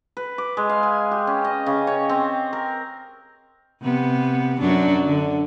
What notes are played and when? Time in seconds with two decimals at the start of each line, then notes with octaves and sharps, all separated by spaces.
0.17 B4
0.38 D6
0.57 G#3
0.69 F5
0.83 G#5
1.11 G4
1.27 C#4
1.44 D#5
1.66 C#3
1.87 C#5
2.09 C4
2.53 A#4
3.83 C3 B3
4.60 F#2 F#3 D4
5.06 D3